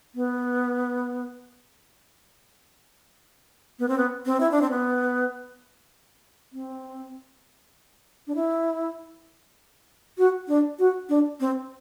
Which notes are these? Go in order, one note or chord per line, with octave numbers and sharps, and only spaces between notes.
B3
B3
C4
B3
C4
E4
D4
C4
B3
C4
D4
E4
F#4
D4
F#4
D4
C4